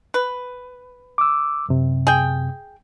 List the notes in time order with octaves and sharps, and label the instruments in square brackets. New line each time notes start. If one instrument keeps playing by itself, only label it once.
[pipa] B4
[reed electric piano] D6 E6
F#2 C3
[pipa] G#4 G5